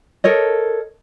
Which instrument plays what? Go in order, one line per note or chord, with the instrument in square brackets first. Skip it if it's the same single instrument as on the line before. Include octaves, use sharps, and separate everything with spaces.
[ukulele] A4 A#4 C#5 D#5